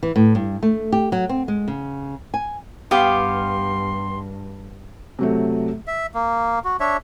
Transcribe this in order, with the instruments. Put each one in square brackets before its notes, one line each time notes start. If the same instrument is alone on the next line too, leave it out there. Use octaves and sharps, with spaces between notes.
[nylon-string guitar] E3
A2
G2
A3
G4
F#3
C4
G#3
C#3
G#5
[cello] G2 [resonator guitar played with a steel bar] B3 G4 [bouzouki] F5 [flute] C6
[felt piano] C3 F#3 A3
[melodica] E5
A#3
F#4
D4 C#5 E5